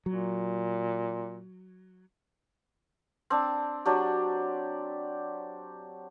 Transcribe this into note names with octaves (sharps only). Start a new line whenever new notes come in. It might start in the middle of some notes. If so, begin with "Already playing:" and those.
A#2 F#3
C4 D4
F#3 D4 G4